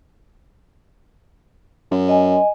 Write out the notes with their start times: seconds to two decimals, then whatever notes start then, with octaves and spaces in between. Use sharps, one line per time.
1.91 F#2
2.09 D#5 G#5